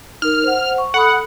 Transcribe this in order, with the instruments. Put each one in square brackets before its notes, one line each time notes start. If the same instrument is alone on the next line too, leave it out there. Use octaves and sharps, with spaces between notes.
[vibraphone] D#4 A#4 [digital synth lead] F6
[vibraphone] C5 F#5
C#6
[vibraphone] A4 B5 D#6 [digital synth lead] F#5